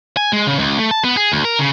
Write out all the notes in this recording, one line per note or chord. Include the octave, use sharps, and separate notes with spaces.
G#5
G#3
C#3
C#2
A3
A5
B3
G#4
D2
A#4
C#3